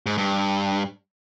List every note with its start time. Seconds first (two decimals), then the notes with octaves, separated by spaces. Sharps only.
0.06 G#2
0.18 G2